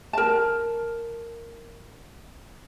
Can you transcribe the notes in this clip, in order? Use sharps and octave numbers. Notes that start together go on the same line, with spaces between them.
A#4 A5